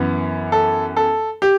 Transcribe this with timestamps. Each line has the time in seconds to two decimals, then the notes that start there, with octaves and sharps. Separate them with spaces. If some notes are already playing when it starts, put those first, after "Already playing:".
Already playing: F#2 E3 B3
0.52 A4
0.97 A4
1.42 G4